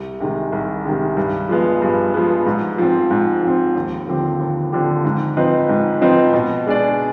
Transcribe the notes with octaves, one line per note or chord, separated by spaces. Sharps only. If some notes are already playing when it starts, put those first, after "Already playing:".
Already playing: C2
C3 D#3 G#3
C2
C3 D#3 G#3
G2
F3 G#3 B3
G2
F3 G#3 B3
G#2
F3 C4
G#2
F3 C4
D#2
D3 F3 C4 G4
D#2
D3 F3 C4 G4
G#2
F3 C4 D#4 B4
G#2
F3 C4 D#4 B4
B2
G#3 D4 G#4 D5